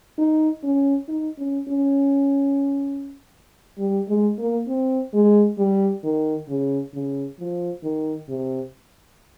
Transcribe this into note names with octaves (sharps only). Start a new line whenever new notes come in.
D#4
C#4
D#4
C#4
C#4
G3
G#3
A#3
C4
G#3
G3
D#3
C#3
C#3
F3
D#3
C3